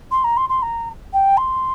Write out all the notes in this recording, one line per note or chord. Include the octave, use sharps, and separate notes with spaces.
C6
A#5
C6
C6
A#5
G5
C6